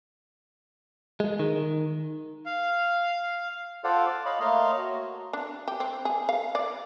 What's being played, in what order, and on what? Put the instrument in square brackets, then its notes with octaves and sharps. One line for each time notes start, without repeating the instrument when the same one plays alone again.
[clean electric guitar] G#3
D#3
[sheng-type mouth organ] F5
[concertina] F4 A4 C5 D5 F5 F#5
D6
C#5 D#5 F5 B5
A3 A#3 C#5 D#5 F5 C6
F#4
[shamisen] D4
G4
C4
G#4
F5
D5